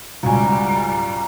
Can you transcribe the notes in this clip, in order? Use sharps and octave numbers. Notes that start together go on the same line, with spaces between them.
C#2 G#2 G3 F#4 G#5 A#5